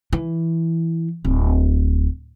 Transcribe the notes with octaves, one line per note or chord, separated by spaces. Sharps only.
E3
D1